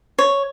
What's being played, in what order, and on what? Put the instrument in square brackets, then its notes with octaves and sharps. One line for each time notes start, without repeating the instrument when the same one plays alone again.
[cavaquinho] C#5